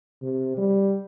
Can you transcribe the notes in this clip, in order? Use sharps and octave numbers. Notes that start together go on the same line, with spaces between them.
C3
G3